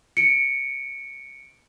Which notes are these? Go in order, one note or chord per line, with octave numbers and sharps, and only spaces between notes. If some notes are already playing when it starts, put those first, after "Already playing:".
C#7 D7